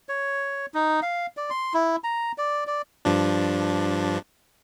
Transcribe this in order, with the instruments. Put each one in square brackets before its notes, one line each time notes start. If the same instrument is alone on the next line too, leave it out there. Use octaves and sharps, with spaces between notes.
[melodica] C#5
D#4
F5
D5
C6
E4
A#5
D5
D5
[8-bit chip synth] G2 F3 D4